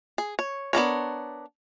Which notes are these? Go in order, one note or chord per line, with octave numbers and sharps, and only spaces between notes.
G#4
C#5
B3 D4 A#4 C#5